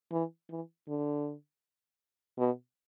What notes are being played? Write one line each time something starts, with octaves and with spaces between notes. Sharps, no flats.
E3
E3
D3
B2